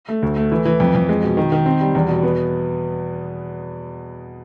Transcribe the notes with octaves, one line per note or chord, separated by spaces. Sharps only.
A3
D2
A3
E3
E3
F2
F2
G#3
B2
D#3
D#3
C4
G3
E2
B2
B3